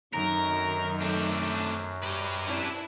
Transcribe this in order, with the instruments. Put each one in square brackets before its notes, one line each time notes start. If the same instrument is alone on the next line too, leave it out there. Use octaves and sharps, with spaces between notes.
[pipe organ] F#2 [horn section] D3 C4 A#5 [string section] D#3 F#3 [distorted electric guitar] A#4
[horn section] A3 [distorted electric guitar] C4 D4
[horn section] G3 [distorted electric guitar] G4 B4
[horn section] C4 [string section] D4 E4